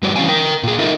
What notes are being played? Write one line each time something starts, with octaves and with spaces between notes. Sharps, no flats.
G2 G3 F#4 C#5 D5
E3 C#4 D4 F5 G#5
A#4 G5
A#2 G#4
D#4 F4 A4 A#4 D#5 E5